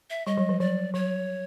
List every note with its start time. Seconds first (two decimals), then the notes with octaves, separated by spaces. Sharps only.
0.10 E5
0.27 G3 D#5
0.37 F#3
0.49 F3
0.60 F#3 D5
0.94 F#3 C#5